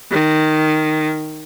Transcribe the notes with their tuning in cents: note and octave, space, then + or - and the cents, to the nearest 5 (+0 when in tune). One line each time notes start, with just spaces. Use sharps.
D#3 -5